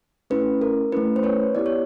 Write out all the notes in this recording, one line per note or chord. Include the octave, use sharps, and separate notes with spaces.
A3 C#4 E4 B4
A#4
A3 C#4 E4 B4
C5
B4 C#5
B3 E4 G4 D5
C#5